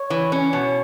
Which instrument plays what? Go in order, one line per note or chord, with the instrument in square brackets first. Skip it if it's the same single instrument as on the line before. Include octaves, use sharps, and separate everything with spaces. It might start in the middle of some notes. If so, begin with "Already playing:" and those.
Already playing: [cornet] C#5
[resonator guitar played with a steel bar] E3
C#4
B2